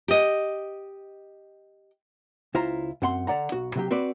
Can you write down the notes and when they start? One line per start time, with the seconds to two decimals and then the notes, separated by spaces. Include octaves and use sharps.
0.08 G4 D#5
2.54 C#2 E4 F4 C5 A#5
3.02 F#2 C4 F#5 C6
3.27 D3 D5 F#5 A#5
3.52 B1 F#4
3.75 C3 F#3 G4
3.91 C4 F#4 B4 D5